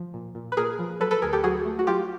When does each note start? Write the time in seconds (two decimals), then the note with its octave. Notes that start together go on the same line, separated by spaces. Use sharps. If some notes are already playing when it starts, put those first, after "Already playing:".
Already playing: F3
0.14 A#2
0.35 A#2
0.52 B4
0.57 A#2 G#4 A#4
0.79 F3
1.00 F#3 A4 B4
1.11 A4 B4
1.22 D2 G#4 A#4
1.33 G4 A4
1.43 F#3 F#4 G#4
1.65 A3
1.79 F#4
1.87 F#3 F4 G4